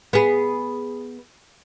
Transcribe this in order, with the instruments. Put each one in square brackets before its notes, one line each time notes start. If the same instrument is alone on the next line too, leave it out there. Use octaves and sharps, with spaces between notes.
[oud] B3 G#4